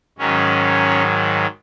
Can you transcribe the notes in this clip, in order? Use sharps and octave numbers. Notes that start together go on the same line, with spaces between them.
G#2 D#3 F#3 C#4